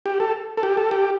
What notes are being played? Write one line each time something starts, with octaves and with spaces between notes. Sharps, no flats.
G4
A4
A4
G4
A4
G4